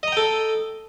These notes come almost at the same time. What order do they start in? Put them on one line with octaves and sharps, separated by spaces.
D#5 A#5 G5 A4